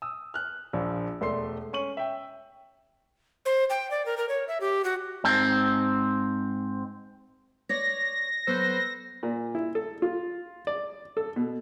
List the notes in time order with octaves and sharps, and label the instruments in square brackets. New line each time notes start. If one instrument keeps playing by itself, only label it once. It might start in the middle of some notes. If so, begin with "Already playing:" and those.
[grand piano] D#6 E6
F6 F#6
A#1 F3
E1 A3 D5 C6 C7
C#4 C#6 D#7 F#7
E5 G5
[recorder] C5
G5
D5
A#4
A#4
C#5
E5
G4
F#4
[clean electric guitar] G#2 C4
[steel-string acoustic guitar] C#5 D5 [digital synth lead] A#6
[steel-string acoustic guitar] F#3 B3 [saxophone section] A4 B4 C5
[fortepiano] A#2
E4
A4
F4
D5
A4
B2